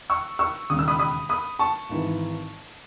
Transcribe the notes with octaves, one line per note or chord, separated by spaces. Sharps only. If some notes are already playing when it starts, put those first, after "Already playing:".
C#6 E6
C#6 E6
E1 D#2 C#3 D#6
E6
B5 D#6
B5 D#6
B5 D#6
A5 C#6
G#1 G#2 E3